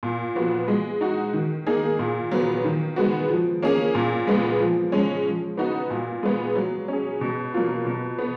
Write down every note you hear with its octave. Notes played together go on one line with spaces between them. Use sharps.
A#2
F3 B3 F#4
G#3
D#4 F#4
D#3
A#3 D#4 G#4
A#2
F#3 B3
D#3
G#3 B3 F#4
F3
A#3 C#4 G#4
A#2
G#3 B3
F3
G#3 C#4
F3
B3 D#4 F#4
A#2
G#3 B3
F#3
C#4 G#4
B2
F#3 A#3 F4
B2
B3